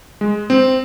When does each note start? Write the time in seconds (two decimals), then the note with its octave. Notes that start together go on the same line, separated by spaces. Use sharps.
0.21 G#3
0.50 C4